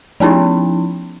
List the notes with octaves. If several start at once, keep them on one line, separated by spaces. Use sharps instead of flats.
F3 B3 C#4 D#4 E4